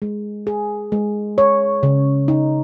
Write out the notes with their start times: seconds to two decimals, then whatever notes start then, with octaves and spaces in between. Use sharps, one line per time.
0.02 G#3
0.47 G#4
0.92 G#3
1.38 C#5
1.83 C#3
2.28 D#4